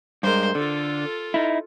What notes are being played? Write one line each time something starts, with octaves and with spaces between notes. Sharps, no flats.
G2 G#3 A#4 C5
D3 F4 A4
D#4 E4